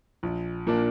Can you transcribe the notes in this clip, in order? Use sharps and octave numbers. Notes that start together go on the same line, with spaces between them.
A#1
A#2 A#3 D4